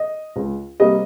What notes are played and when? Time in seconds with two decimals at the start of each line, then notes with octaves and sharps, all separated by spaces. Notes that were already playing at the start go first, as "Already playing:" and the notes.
Already playing: D#5
0.36 C#2
0.80 C3 G3 A#3 D#5